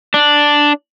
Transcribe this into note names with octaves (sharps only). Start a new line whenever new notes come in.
D4